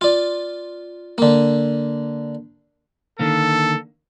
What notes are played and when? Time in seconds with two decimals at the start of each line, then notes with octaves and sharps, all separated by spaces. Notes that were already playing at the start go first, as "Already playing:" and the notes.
0.01 F4 D5
1.18 D3 A#3
3.19 D3 D#3 A#3 A4